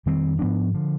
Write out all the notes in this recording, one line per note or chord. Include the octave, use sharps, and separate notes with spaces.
F2 D#3 G3 C4
G#2 F3 B3 D4
D3 F3